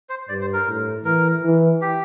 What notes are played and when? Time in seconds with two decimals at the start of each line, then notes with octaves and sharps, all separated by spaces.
0.09 C5
0.29 G2 D5
0.41 C5
0.54 A#4
0.67 A2
1.05 E3 A#4
1.43 E3
1.82 G4